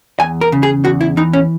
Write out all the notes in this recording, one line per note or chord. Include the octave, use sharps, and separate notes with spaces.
E2 G#5
A#4
C#3
G#4
E2 F#4
E4
E3 D#4
C#4